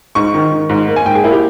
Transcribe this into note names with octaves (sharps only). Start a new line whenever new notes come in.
G#2 C#6
D#3
D#3
G#2
A#3
G#5
G#2 G5
G#4
A#3 E4
G4